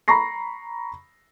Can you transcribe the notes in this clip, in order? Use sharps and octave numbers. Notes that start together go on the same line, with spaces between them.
A#5 B5 C#6 A#6 C7